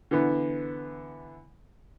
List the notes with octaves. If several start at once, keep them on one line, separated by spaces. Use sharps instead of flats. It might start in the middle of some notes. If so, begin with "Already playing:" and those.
D3 E3 B3